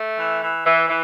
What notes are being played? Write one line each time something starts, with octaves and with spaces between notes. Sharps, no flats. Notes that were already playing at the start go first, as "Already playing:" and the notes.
Already playing: A3
E3
E3
E3
E3